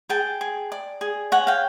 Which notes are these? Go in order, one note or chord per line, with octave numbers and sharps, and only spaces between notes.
G#4 G5 A5
G#4
D5
G#4
C#5 F#5 G#5
F5 G5